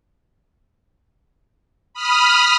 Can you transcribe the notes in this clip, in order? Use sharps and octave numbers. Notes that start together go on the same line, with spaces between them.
B5 D#6 F6